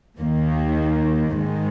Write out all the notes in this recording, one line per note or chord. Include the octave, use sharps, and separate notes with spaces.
D#2 D#3 A#3
G#2 D#3 G#3